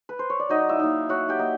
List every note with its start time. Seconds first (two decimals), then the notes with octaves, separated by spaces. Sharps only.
0.09 B4
0.19 C5
0.30 C#5
0.39 D5
0.49 F#3 D#4 D#5
0.69 E4 E5
0.79 A#3 D#4
1.09 F#3 F#4 F#5
1.29 G4 G5
1.39 A#3 D#4